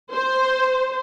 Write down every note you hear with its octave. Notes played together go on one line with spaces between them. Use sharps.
C5